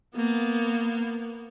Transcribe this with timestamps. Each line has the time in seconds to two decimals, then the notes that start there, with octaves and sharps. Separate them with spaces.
0.15 A#3 B3